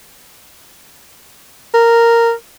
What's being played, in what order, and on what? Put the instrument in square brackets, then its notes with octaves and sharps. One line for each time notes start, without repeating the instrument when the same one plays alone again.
[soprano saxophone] A#4